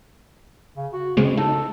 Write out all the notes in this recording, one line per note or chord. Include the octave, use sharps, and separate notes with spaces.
C#3
F#4
C#3 G#3 B3 C4
D#4 A4